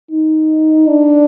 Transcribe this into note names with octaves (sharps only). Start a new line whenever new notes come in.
D#4
D4